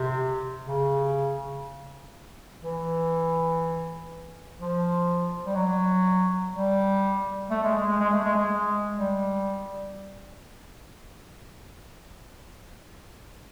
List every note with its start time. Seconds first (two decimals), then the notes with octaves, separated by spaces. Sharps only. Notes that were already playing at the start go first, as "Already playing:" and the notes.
Already playing: C3
0.67 C#3
2.62 E3
4.58 F3
5.46 G3
5.55 F#3
6.53 G3
7.50 A3
7.63 G#3
7.75 G#3
7.87 G#3
7.99 G#3
8.12 A3
8.24 G#3
8.36 G#3
8.97 G3